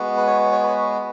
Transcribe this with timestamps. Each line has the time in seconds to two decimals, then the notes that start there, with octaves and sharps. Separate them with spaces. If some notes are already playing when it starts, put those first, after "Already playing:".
Already playing: G#3 B3 F#4
0.17 B4
0.27 C#5
0.52 C#5
0.63 B4